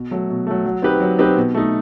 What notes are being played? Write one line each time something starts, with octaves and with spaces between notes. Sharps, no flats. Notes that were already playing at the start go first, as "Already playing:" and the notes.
Already playing: B2
F#3 A3
B2
F#3 A3
F#3
C4 D#4 G4 B4
F#3
C4 D#4 G4 B4
B2
A3 D#4